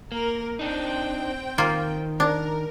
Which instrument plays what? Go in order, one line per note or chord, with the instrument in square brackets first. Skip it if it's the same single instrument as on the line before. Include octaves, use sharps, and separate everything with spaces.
[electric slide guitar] A#3 [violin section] A#4
[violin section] C4 G5 [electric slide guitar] D4 D#4
[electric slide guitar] D#3 [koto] A#3 F4
[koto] D4 [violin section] A#4